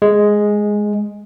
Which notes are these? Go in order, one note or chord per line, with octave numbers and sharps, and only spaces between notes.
G#3